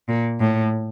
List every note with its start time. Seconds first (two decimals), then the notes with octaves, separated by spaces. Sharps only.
0.09 A#2
0.40 A2